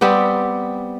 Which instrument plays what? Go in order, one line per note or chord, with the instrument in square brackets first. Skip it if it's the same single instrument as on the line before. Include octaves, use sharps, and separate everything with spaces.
[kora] G3 B3 C4 G4